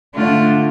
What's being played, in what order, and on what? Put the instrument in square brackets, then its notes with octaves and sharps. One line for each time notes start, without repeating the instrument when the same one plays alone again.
[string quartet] D3 A3 D4 F4